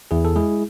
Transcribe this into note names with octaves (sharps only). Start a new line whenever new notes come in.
E2 E4 G#4
A4
G#3 E4 G#4